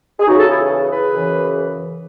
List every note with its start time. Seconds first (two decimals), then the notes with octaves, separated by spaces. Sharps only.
0.20 G#4
0.27 E2 C#3 E3 D#4 F#4
0.38 A4
0.49 E4 G#4
0.91 G#4 B4
1.12 F#2 C#3 E3